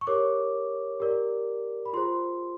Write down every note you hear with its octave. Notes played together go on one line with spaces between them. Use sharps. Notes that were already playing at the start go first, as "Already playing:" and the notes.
C#6
G4 A#4 C#5 D6
G4 A#4 D5
B5
F4 G#4 C5 C6